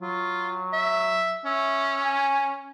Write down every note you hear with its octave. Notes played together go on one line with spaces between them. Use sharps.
F#3 F4
E5
C#4 E5
G#5